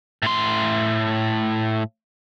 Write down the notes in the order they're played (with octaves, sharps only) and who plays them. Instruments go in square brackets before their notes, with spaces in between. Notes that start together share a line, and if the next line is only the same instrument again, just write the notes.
[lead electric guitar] A2 C6